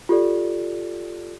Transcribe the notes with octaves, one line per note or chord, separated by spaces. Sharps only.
F4 G4 A4 D5